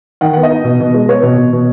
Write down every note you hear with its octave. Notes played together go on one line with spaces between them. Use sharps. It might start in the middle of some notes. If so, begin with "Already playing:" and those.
D#3 F#5
B3 F#5
D#5
D#4
B2
B2
G#3
B3 C#5
B2
B2
B2